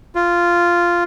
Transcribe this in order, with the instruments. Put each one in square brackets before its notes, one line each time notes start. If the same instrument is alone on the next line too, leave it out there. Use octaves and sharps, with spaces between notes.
[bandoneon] F4